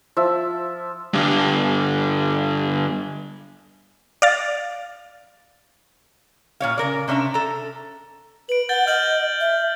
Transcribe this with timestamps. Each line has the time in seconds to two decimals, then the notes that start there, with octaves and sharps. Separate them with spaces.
0.17 F3 E5
1.14 G2 D3
4.22 D5 F5 A6
6.60 A#2 C#5 F5
6.78 C#3 A#4 D5
7.08 C3 C#4 D4 E5 A#5
7.34 A4 A#5
8.49 B4 D7 F#7
8.69 F#5 G6 A6 G7
8.87 D#5 F6 G6 F#7
9.40 E5